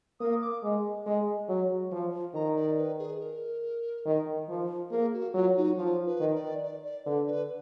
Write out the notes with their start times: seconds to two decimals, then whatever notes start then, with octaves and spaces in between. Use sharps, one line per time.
0.20 A#3 D#6
0.42 D6
0.63 G#3
1.06 G#3
1.49 F#3
1.92 F3
2.34 D#3 A#5
2.56 D5
2.77 B4
2.99 G#4
3.20 A#4
4.05 D#3
4.49 F3
4.91 A#3 G#4
5.14 F#4
5.34 F#3 F4
5.56 D#4
5.77 F3 F4
6.06 B4
6.20 D#3
6.34 D5
6.63 D5
6.84 D5
7.05 D3 B4
7.27 B4